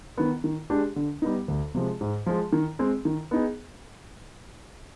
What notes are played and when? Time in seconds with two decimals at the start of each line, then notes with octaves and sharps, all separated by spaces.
0.18 D#3 B3
0.44 D#3
0.70 G#3 D4 G4
0.96 D3
1.22 G3 B3 D#4
1.48 D2
1.75 C3 F3 G#3
2.01 G#2
2.26 F3 G#3
2.53 D#3
2.79 G#3 C4
3.05 D#3
3.31 B3 D#4 G#4